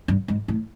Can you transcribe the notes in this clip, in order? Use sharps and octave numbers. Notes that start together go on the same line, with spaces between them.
G2
G#2
A2